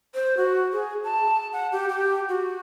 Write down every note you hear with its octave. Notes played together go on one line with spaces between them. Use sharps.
C5
F#4
G#4
A5
F#5
G4
G4
F#4